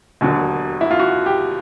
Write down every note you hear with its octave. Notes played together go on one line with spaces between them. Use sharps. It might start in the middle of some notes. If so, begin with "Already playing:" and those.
E1 D#2 D3 F#3
E4
F4
F#4
G4